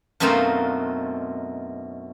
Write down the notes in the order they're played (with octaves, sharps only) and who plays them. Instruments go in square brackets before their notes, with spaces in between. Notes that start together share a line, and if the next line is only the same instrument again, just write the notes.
[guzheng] F#2 B2 A3 C4 D#4 F4